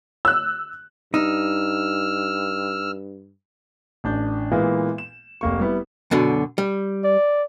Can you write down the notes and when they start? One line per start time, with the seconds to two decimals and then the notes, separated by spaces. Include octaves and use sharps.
0.25 E6 F#6
1.14 G2 D#4 E6 F6
4.04 A1 D4 G6
4.52 A#2 E3 G#3 A#3 B3
4.98 E7
5.41 F1 A#3 C#6
5.60 G3 B3 E4
6.11 F#2 B2 D3
6.58 G3
7.04 D5